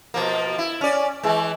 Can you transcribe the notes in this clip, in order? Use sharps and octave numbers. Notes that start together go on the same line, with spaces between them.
B2 F3 A#3
E4
C#4 D5
E3 G#3